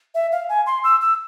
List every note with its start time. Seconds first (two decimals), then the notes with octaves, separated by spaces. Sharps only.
0.15 E5
0.32 F5
0.49 G#5
0.66 C6
0.84 E6
1.01 E6